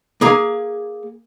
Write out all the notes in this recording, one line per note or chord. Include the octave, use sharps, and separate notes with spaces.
A#3 G#4 A#5